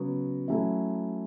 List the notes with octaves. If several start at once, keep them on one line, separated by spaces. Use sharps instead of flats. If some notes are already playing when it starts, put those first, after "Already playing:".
Already playing: C#3 F#3 B3 F#4
F#3 A3 C#4 E4